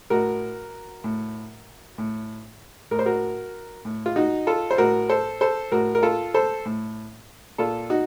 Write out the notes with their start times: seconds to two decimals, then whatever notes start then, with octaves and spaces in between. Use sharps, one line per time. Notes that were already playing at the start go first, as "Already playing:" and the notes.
0.10 A2 F#4 A#4
1.04 A2
1.98 A2
2.91 A2 A#4
2.99 C5
3.06 F#4 A#4
3.85 A2
4.06 F4
4.16 D#4 F#4
4.47 F4 A4
4.71 C5
4.78 A2 F#4 A#4
5.09 A4 C5
5.41 A4 C5
5.72 A2 F#4 A#4
5.95 A#4
6.03 F4 A4
6.34 A4 C5
6.65 A2
7.58 A#2 F4 A4
7.90 D#4 F#4